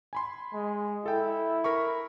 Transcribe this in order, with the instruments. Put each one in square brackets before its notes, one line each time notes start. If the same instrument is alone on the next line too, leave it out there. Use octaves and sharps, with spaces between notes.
[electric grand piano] G#5 B5 C6
[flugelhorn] G#3
[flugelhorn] E4 [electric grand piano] A4 G5
[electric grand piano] A#4 B5 C#6